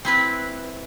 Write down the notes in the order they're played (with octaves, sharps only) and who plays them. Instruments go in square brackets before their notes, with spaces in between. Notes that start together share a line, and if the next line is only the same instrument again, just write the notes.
[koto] C4 E4 B4